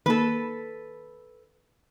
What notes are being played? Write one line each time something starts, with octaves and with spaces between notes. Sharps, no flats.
D#3 A#3 A4 B4